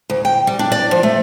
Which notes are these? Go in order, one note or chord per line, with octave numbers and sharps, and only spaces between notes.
D2
G5
G3
D4
D5
F3
A3